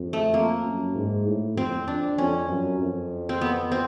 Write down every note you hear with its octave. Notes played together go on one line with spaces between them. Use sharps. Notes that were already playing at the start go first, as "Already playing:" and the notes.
Already playing: F2
A3
F2 A#3
F#2
G#2
A2
F2 C4
F2 D4
F2 C#4
F#2
F2
C4
B3
C4